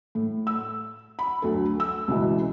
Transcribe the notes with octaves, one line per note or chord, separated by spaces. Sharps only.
A2
E6
B5
D2 F#3 A4
E6
C#2 B2 E3